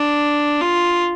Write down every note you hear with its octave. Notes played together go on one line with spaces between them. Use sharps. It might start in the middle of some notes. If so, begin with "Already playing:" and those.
Already playing: D4
F4